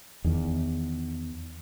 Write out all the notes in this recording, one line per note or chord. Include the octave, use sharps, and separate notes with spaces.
E2 D#3